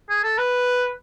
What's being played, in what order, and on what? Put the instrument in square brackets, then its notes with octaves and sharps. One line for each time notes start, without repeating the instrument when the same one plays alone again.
[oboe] G#4
A4
B4